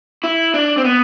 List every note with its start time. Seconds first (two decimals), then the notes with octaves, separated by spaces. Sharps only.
0.24 E4
0.54 D4
0.78 C4
0.84 B3